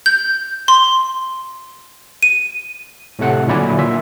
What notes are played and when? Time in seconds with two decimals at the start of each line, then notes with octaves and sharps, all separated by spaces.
0.06 G6
0.68 C6
2.23 D#7
3.19 A2 C3 A3 F#5
3.47 A#2 D3 F#3 E4 D5 G#5
3.79 A#3 F4 E5